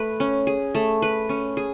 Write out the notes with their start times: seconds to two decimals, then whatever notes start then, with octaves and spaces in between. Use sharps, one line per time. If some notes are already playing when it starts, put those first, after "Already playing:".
Already playing: A3 B4
0.20 C#4
0.47 G#4
0.75 A3
1.02 B4
1.29 C#4
1.57 G#4